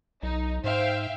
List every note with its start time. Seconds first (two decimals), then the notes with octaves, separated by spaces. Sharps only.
0.23 B1 D#4
0.64 G#2 C5 E5 F5 G5